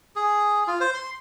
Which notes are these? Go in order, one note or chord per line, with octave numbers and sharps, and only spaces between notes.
G#4
F4
C5
C6